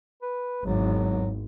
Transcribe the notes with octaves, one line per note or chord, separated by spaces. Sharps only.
B4
G#1 E2 G#2 F#3